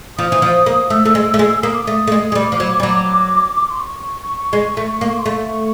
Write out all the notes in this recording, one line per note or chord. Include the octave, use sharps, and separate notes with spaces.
F3 D#6
E3
F3
A#3
A3 E6
A3
G#3
A3
G#3
A#3 D#6
D6
A3 D#6
A3
G#3
G#3
G3 D6
F3
F#3
G3
F#3
C6
C#6
G#3
A3
A#3
C6
A3 C#6